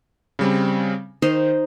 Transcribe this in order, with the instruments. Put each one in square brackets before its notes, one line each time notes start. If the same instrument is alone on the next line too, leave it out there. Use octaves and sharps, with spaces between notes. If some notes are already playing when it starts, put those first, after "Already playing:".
[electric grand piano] C#3 G3 C4
[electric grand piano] D#3 [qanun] D#4 C5